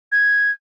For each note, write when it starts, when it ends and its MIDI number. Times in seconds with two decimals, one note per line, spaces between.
0.12 0.51 92